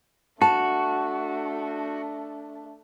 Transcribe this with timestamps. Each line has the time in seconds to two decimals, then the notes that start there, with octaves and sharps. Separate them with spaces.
0.42 A3 D4 F#4 A5